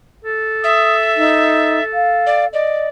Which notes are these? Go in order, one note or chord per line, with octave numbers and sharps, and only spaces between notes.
A4
E5 D#6
D#4
F5
D5
D5 D#5